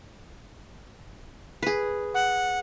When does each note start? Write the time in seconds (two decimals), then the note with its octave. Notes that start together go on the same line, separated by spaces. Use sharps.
1.62 G#4 B4
2.14 F#5